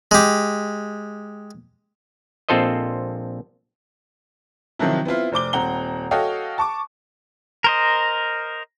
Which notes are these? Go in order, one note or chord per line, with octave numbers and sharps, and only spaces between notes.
G#3 G4
A#1 C4 F4 A4 C5 D#5
C3 D#3 F3 F#3 E4
B3 C4 E4 F4
F1 C5 D6 G7
D#1 C4 F#5 A#5 G7
F#4 A4 C#5 D#5 F5 G5
A5 C#6 D6
A#4 C5 D#5